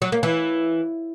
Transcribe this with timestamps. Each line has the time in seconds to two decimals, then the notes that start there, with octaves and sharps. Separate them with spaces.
0.02 F#3
0.12 A#3
0.23 E3